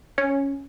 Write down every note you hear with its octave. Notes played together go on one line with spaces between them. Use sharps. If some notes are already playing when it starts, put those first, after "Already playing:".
C#4